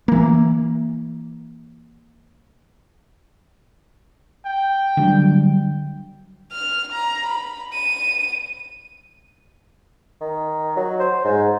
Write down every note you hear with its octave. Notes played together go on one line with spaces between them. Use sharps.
E3 A#3
G5
D3 F#3 G3
F6
A#5
B5
D#7
D#3
F#3
C5
G#2